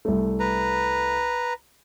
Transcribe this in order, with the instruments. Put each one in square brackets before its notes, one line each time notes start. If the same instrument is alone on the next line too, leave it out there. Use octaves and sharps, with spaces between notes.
[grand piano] C2 A3
[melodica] B4 A#5